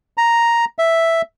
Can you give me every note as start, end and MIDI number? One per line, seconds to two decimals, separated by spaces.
0.17 0.65 82
0.79 1.22 76